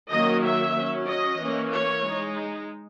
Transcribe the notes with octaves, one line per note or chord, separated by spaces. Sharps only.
D#3 F#3 A#3 C#4 D#5
E5
F#3 C#4
D#5
E3 A#3 C#4
C#5
G#3 D#4